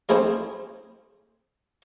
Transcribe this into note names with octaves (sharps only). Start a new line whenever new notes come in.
A3 C4 D4 E4 G#4 D#5